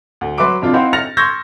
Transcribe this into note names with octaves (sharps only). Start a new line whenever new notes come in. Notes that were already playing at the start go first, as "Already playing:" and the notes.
D2
F#3 B4 E5 C6 D6 D7
F2 C3 D4 F4
C4 D#4 E4 C5 F5 F#5
F6 A6 A#6 C#7 F7
C6 C#6 E6 G6 G#6 A#6